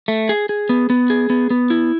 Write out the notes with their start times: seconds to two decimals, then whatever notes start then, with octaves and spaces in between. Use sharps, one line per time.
0.08 A3
0.29 G#4
0.49 G#4
0.69 B3
0.90 B3
1.10 G#4
1.30 B3
1.50 B3
1.70 E4